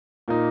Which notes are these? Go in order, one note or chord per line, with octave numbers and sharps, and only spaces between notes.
A#2 A#3 D#4